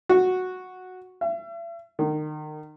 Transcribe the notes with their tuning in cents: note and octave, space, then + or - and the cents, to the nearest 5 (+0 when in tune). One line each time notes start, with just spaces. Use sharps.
F#4 -5
E5 +40
D#3 -30